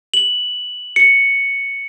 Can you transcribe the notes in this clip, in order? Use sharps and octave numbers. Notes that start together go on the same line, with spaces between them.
F#7
C#7